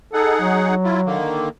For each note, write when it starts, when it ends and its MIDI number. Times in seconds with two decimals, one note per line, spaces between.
0.14 0.75 63
0.14 0.75 68
0.14 0.38 69
0.14 0.75 78
0.41 1.17 54
0.84 1.01 64
0.84 1.01 65
1.06 1.49 50
1.06 1.49 51
1.06 1.49 58